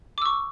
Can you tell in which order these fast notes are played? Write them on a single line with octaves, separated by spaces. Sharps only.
D6 E6 C#6